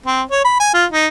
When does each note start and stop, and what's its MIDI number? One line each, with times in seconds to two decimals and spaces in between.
0.06 0.22 60
0.31 0.43 73
0.45 0.57 83
0.60 0.74 80
0.74 0.86 65
0.92 1.07 63